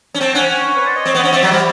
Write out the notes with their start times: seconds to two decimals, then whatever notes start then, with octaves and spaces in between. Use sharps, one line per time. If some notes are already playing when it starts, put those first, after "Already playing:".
0.14 C#4
0.20 C4 G5 A5
0.35 C#4 F#5 G#5
0.48 F#5 G#5
0.77 B4 C#5
0.86 C5 D5
0.95 C#5 D#5
1.06 C4
1.15 B3
1.24 C#4
1.33 C4 D5 E5
1.42 F#3
1.51 G3